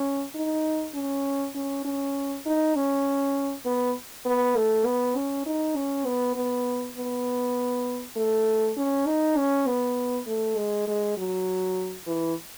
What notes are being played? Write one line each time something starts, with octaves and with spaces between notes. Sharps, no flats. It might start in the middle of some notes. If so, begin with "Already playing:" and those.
Already playing: C#4
D#4
C#4
C#4
C#4
D#4
C#4
B3
B3
A3
B3
C#4
D#4
C#4
B3
B3
B3
A3
C#4
D#4
C#4
B3
A3
G#3
G#3
F#3
E3